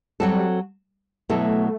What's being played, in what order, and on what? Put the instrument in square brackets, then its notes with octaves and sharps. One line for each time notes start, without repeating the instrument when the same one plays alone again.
[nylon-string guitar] F#3 C4 F#4 A4 [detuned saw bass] G3
[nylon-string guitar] B2 F#3 B3 E4 A4 [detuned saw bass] A3